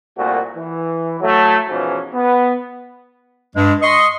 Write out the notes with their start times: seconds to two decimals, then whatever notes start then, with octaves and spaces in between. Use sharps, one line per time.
0.17 C2 A#2 A3 F#4
0.55 E3
1.21 F#3 A3
1.68 G#2 B2 E3 F3 C#4
2.14 B3
3.55 G2 G#3
3.82 D#5 C6 C#6